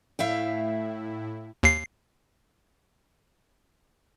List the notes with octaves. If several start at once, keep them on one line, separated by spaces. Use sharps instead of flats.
A2 E4 E5 F5 G5
D#2 C7